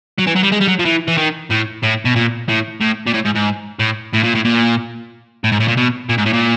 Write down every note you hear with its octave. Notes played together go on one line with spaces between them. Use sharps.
F#3
E3
F#3
G3
G#3
G3
F#3
F3
E3
E3
D#3
A2
A2
B2
A#2
A2
A2
A#2
A2
G#2
G#2
A2
A2
A#2
A2
A#2
A2
G#2
A2
A#2
B2
A#2
G#2
A2
A#2